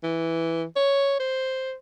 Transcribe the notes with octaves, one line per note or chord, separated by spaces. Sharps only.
E3
C#5
C5